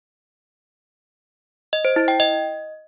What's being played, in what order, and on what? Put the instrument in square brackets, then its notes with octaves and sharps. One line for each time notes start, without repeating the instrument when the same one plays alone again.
[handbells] D#5
C5
E4
G5
D#5